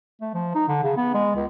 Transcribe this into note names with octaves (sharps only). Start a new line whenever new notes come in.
A3
F3
D#4
D3
C#3
B3
G#3
C#2